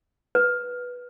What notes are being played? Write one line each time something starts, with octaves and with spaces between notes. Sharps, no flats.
B4